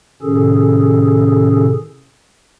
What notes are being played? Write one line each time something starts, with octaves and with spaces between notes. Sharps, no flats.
A2 C3 D#3 C#4 G#4 A4